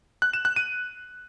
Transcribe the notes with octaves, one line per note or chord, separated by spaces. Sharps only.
F#6
E7
F#6
D#7